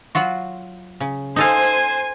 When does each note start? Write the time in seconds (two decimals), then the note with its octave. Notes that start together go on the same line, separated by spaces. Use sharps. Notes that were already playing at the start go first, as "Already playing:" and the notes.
0.15 F#3 F4 F#4
1.00 C#3
1.36 D#4 A4 C5 F5 G#5